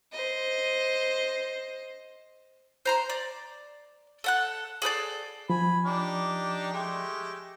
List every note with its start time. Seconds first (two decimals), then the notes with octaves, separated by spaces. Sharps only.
0.12 C5 D#5
2.85 C5 A#5 C6
3.10 D5
4.24 A4 F#5 F#6
4.82 G#4 A4 B4 D5
5.50 F3 G#5 B5
5.86 D4 D#4 G4
6.74 G#3 A3 G4